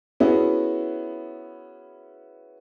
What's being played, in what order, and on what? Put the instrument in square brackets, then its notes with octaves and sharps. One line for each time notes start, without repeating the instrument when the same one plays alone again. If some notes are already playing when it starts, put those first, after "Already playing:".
[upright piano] B3 C#4 E4 F#4 G#4